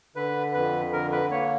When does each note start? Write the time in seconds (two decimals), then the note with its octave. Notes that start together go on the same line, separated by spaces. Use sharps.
0.15 D3 B4
0.54 F2 B4
0.93 D3 A#4
1.12 B4
1.31 A#3 C#5